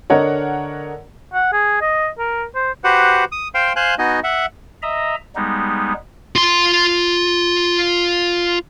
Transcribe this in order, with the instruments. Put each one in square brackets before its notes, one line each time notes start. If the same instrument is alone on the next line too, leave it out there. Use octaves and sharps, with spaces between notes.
[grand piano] D3 D4 A#4 [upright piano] C#5 D#5 F#5
[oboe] F#5
G#4
D#5
A#4
C5
[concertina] F#4 G4 B4 C5 F#5
D#6
C5 F5 G5 C6
C5 F5 G#5 C6 F#6
B3 D#4 F#4 D#5 G#5
E5 F#5
[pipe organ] D#5 E5 A#5
G3 G#3 B3 D#4
[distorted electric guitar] F4 C6